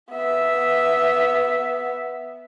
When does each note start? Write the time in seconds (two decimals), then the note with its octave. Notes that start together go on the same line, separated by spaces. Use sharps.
0.12 B3 E5